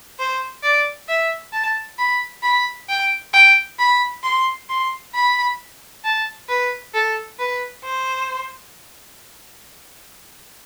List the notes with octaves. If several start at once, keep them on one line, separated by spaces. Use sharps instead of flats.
C5
D5
E5
A5
B5
B5
G5
G5
B5
C6
C6
B5
A5
B4
A4
B4
C5